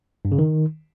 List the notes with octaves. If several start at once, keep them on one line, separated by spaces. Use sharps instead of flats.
G2
C#3
D#3